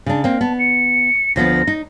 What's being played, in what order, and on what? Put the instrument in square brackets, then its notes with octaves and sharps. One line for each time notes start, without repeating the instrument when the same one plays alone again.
[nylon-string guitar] C#3 D4
A#3 C4
[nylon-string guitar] B3 [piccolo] A5
[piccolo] C#7
[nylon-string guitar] D2 F3 B3 [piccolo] A#6
[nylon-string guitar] D#4